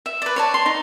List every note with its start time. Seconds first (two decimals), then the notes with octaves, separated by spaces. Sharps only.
0.06 E5
0.22 B4 D5
0.36 C#5 D5 A5
0.54 C6
0.66 D#4